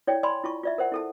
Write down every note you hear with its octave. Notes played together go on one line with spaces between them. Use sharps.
E4 C#5 D5 G5
D5 G#5 B5 C6
E4 F4 A5 C#6
F4 D5 E5
A#4 C5 F#5
E4 A4 A5